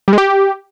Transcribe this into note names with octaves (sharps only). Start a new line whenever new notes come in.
G3
G#3
G4